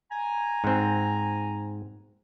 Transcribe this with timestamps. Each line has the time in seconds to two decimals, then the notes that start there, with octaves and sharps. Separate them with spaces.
0.11 G#5 A#5
0.64 G#2 C4